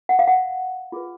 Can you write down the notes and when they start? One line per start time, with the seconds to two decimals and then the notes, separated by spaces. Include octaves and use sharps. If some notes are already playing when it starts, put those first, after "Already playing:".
0.09 F#5
0.19 F5
0.28 F#5
0.92 F4 G#4 B4